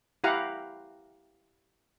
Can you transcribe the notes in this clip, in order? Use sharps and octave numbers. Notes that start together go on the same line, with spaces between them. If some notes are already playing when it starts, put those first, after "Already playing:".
E4 G4 F5 F#5 A#5